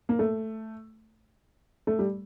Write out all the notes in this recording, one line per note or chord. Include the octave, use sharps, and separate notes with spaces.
A#3
A3
A3
G3